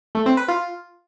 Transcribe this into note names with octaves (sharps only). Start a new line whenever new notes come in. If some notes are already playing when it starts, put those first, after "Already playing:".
A3
C4
B4
F4